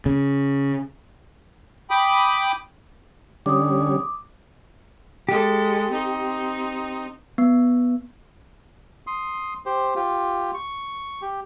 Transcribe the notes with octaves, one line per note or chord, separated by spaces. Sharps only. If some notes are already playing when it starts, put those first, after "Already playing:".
C#3
G5 B5 D6 D#6
D3 G3 C#4 D6 D#6
G#3 G4 A4
C4 D#4
B3
C6 D#6
G4 C5
F4 G4
C#6
G4